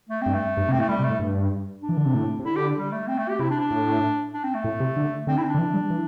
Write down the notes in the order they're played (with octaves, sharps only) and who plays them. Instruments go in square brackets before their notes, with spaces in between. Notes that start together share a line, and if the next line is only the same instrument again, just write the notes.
[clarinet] A3
[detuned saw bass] G2 [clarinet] C4
[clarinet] A3
[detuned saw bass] G2
C3
[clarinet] C4
[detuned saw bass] A2 [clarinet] A3
[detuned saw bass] A2 [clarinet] G3
[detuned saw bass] C3
[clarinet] A3
[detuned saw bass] A2
G2
[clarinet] D4
[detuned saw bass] E3
D3
C3
A2
C3
[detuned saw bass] D3 [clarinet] E4
[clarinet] G4
G3
A3
C4
A3
G4
[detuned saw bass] C3 [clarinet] E4
[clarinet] D4
D4
[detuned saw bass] A2
[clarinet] D4
C4
A3
[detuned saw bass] A2
C3
D3
[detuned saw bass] D3 [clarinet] C4
[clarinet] E4
C4
D4
[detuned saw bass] D3
E3
G3
E3